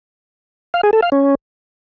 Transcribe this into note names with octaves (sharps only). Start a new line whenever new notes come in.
F5
G#4
A4
F5
C#4